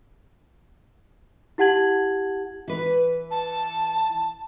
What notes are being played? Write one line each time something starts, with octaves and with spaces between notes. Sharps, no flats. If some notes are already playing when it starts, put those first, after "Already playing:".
E4 G4 F#5 A5 G#6 F#7
E3 B4
A5